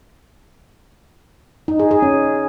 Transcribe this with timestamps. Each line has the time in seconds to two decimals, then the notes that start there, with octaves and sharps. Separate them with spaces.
1.68 D#4
1.80 G#4
1.91 G#4
2.02 C#4